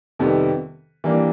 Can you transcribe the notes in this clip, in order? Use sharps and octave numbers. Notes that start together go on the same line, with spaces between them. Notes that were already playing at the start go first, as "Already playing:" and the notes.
F2 C3 D#3 G3 B3
E3 G3 A#3 D4